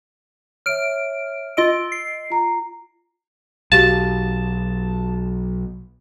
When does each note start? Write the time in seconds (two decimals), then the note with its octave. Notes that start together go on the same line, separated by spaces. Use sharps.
0.66 C#5 E5 F6 D7
1.57 F4 D#5 E6 D7
1.92 C7
2.30 F4 A#5
3.72 B1 F#4 G4 F5 A5